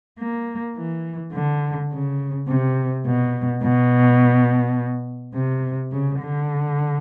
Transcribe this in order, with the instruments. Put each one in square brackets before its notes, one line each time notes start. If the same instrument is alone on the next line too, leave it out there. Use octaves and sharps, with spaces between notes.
[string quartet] A#3
E3
D3
C#3
C3
B2
B2
C3
C#3
D3